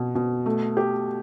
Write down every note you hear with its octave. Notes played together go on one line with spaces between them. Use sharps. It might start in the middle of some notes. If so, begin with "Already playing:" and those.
Already playing: B2
B2
A3
G4